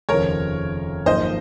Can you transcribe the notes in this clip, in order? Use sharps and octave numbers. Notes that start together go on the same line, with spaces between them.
F1 D#2 C#3 F3 A#4 C#5
G#1 F#2 F3 A#3 D#4 C5 D#5